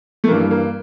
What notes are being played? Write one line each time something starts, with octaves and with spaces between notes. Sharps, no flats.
A3
G2 E3 A#3
A#3